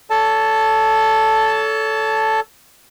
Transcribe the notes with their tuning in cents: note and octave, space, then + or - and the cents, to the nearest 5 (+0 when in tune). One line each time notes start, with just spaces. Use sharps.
A4 +0 C#5 +35 A5 +0